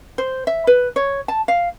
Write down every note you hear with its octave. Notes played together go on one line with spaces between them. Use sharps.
C5
E5
B4
C#5
A5
F5